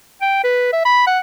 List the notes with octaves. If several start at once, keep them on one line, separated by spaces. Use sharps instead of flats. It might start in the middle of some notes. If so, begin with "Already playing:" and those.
G5
B4
E5
B5
F#5